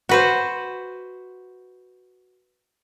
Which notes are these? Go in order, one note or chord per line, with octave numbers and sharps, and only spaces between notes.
F#4 B4 C5